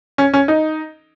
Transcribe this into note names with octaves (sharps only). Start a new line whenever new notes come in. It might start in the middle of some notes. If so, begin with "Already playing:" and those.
C#4
C#4
D#4